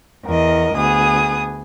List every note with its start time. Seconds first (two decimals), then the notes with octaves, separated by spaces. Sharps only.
0.25 E2 A#4 D#5
0.75 D2 B3 G#4 D#6